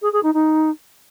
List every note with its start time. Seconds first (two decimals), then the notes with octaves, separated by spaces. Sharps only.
0.02 G#4
0.13 G#4
0.23 D#4
0.34 D#4